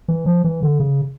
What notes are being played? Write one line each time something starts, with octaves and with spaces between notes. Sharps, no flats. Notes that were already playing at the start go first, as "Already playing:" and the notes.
E3
F3
E3
D3
C#3